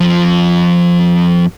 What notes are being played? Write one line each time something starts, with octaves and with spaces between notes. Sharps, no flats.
F2 F3